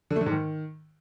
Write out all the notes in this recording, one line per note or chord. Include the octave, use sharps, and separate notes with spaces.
D3
A3
D3
G#2
D#3